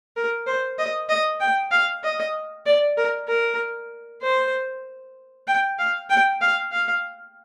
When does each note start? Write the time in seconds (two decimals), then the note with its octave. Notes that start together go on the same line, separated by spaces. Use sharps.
0.16 A#4
0.47 C5
0.79 D#5
1.09 D#5
1.40 G5
1.71 F5
2.04 D#5
2.66 D5
2.97 A#4
3.28 A#4
4.22 C5
5.47 G5
5.79 F5
6.10 G5
6.41 F5
6.72 F5